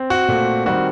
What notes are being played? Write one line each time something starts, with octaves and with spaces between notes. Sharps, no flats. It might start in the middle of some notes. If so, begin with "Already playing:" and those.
Already playing: C4
F#4
A#2 A3 C4
D#3 G3 C4 F#4